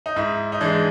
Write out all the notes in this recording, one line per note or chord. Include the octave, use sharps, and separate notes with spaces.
D#4
G#2 E4
D#4
E3 G#3 D4